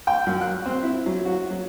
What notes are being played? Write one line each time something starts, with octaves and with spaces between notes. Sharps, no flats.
G5
F#2
F#6
C4
E4
F#3
F#4
F#3